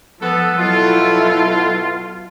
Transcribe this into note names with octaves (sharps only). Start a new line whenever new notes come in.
F3 B3 A4
B2 F#3 E4 F4 A4